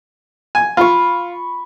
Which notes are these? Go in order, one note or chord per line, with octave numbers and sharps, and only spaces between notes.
G#5
F4 B5 C#6